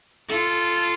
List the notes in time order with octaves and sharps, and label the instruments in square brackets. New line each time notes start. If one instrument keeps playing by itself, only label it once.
[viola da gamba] F4 A4